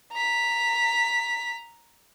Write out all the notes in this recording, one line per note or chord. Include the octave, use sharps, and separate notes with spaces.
A#5 B6